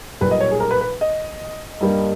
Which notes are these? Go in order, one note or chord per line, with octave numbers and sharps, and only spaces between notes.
B1 A#2 G3 B4
D#5
C#5
G#4
A#4
B4
B4
D#5
G2 G3 A#3